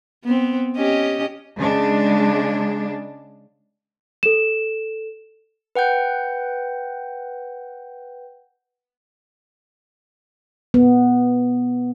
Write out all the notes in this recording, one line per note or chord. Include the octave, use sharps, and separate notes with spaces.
B3 C4
C#4 G4 D#5
C#3 G#3 D4
A4 E7
B4 F#5 G5 G6
B3